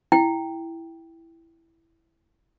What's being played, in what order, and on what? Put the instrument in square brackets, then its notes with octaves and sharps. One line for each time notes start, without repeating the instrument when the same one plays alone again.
[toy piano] E4 G5